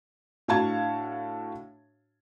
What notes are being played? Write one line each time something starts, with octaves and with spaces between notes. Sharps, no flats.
A2 D4 F#4 F5 A5 G#6